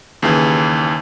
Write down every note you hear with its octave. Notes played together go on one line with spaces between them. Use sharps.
D#2 C#3 E3